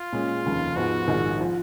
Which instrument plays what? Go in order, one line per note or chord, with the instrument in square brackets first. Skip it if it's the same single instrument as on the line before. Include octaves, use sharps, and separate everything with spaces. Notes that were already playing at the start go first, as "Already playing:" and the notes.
Already playing: [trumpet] F4
[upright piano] A#2 G#3 C#4 G#4
F1 D#2 C#3
[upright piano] G#2 F3 G#3 B3 [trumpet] F#4
[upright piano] A#1 G#2 D#3 G#3
F3